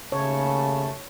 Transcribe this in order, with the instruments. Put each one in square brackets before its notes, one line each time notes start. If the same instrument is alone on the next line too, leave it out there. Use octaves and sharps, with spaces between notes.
[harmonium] D#2 A3 A5 [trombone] C#3 [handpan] C#5